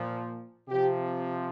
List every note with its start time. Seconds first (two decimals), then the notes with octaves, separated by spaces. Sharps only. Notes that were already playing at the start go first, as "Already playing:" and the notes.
Already playing: A#2 F3
0.68 C3 F3 G4